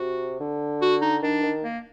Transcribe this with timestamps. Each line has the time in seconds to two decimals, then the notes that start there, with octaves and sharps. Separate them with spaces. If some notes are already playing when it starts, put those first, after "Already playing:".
Already playing: C3 F#4
0.40 D3
0.82 F#4
1.02 D#4
1.22 D#3 D4
1.43 D#3
1.64 A#3